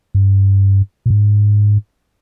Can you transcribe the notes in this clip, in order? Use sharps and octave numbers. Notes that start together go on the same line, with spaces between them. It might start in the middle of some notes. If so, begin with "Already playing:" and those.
G2
A#2
G#2